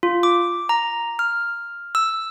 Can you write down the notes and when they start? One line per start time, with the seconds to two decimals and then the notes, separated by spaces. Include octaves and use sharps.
0.03 F4
0.23 D6
0.69 A#5
1.19 F6
1.95 E6